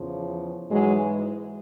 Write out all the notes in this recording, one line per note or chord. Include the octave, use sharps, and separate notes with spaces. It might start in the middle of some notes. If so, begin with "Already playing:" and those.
Already playing: E2 C#3 F3
G#2 E3 F#3 G#3